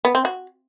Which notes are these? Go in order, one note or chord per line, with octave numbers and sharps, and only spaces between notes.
B3
C4
F#4